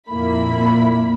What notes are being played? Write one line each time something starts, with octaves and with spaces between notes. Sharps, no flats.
F2 A#2 A#3 E4 B5